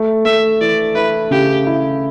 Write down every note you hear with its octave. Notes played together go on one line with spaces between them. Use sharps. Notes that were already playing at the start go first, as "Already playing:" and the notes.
Already playing: A3
A3 E5
E3 D5
E4 B4
C#3 G4
E4